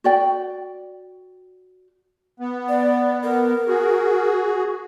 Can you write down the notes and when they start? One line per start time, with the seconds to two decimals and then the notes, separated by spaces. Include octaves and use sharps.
0.04 F#4 D5 G5
2.40 B3
2.69 D5
3.23 A#4
3.67 F#4 G#4